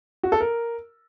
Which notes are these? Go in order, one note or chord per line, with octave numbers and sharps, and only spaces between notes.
F#4
A4
A#4